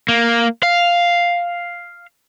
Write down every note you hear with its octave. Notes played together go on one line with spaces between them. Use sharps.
A#3
F5